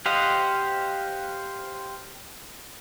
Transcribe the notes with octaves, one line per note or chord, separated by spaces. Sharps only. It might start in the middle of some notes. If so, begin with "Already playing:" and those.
G4 C5 D#5 F5 F#5